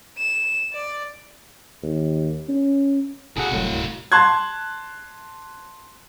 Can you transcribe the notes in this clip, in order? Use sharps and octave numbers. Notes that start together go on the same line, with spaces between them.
E7
D5
D#2
C#4
A#1 C3 E4 F#4 G#4 A4 F#5
F1 C2 A2 F#3
D1 G2
A5 C6 F#6 G#6